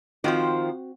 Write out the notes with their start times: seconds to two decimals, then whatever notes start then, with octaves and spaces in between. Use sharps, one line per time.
0.24 D#3 F3 C4 F4 F#4 C5